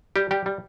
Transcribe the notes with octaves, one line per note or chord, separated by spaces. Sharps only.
G3 G4
G3 G4
G3